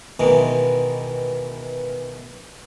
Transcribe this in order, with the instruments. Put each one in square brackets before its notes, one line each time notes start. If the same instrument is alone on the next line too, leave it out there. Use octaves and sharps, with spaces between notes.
[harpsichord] B2 D#3 E3 G#3